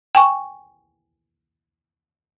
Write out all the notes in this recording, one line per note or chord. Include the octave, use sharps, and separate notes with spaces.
G5 G#5 C#6